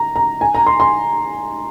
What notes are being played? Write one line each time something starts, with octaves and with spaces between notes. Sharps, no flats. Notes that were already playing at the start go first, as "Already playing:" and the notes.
Already playing: A#5
A#5
G#5
A#5
C6
C6